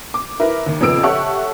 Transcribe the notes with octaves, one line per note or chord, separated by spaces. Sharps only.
D6
E4 A#4 B4
D#2
F2 A#2 C#3 B3 E6 D7
G4 A4 C#5 E5 F#5 C#6